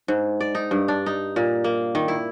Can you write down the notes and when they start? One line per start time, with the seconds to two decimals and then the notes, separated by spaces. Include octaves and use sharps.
0.08 G#2
0.40 D5
0.55 D#4
0.71 G2
0.88 D4
1.06 D#4
1.36 A#2
1.64 A#3
1.95 D#3
2.08 E4